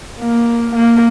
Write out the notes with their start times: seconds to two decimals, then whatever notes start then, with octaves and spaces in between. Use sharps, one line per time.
0.19 A#3
0.76 A#3